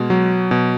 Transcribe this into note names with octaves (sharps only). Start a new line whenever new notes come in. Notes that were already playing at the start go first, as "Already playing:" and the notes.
Already playing: B2 G#3
F#3
B2